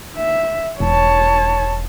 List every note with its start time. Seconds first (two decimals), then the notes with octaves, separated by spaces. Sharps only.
0.16 E5
0.80 E1 C#5 A5